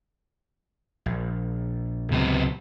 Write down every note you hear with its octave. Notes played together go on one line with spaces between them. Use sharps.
A#1
C#2 C3 F#3 B3